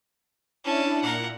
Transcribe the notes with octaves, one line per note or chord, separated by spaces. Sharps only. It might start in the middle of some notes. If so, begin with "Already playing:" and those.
C#4 D4 E4 A5
A#2 A#4 F#5